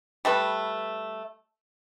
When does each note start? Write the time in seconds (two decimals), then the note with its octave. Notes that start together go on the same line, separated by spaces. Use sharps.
0.25 G3 A3 B4